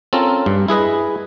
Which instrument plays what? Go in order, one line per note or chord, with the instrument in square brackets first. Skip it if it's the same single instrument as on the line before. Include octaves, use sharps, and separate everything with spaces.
[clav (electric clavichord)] C4 C#4 F4 A4 A#4
G2
E4 G#4 B4 D#5